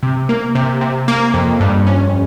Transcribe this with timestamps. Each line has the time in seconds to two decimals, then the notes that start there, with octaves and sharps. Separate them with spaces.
0.03 C3
0.29 A#3
0.55 C3
0.81 C3
1.08 A#3
1.34 F2
1.60 G2
1.87 C#4